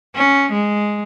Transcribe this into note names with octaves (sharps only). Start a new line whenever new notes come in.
C#4
G#3